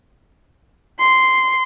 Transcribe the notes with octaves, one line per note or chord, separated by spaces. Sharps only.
C6